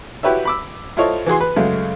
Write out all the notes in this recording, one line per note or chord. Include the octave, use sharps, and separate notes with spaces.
E4 F#4 G4 B4 C#5 E5
B5 D6 E6
E4 F4 A4 C5 C#5 D#5
E3 F#4 G#4 C6
B4
F#2 C#3 G#3 A3